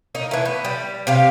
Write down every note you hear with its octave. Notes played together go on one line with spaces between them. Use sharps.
A#3 D#4 A#4
E3 A3
B3
G3
C3 G4 F5